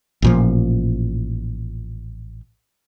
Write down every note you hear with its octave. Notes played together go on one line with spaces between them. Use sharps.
A1 A#2 F3